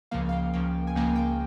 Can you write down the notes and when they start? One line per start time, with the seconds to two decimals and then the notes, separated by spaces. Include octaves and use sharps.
0.11 C#2 C#3 F3 A#3 F5
0.29 F5
0.32 G5
0.53 C#2 C#3 F3 A#3 G5
0.87 G#5
0.95 C#2 C#3 F3 A#3 G5
1.16 G5